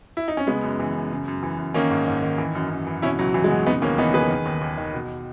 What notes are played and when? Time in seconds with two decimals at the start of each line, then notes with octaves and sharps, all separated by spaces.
0.17 E4
0.28 D#4
0.37 C#4
0.47 C#3 G#3 B3
0.63 F#2
0.80 E3
0.95 F#2
1.11 C#3
1.28 F#2
1.43 E3
1.58 F#2
1.74 D#3 A#3 C#4
1.90 G#2
2.07 G#2
2.23 D#3
2.38 E3
2.55 F#2
2.70 F#2
2.87 E3
3.02 B2 C#4 E4
3.19 C#2 F#3
3.34 C#2 E3
3.44 G#3
3.50 B2 F#3
3.66 C#3 B3 D#4
3.82 D#2 A#3 C#4
3.98 E3 B3 D#4
4.14 D#2 G#4 B4
4.30 D#3
4.46 D#2
4.61 D#2
4.77 D#3
4.94 B2